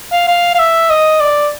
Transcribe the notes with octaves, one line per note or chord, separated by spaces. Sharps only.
F5
F5
F5
E5
D#5
D5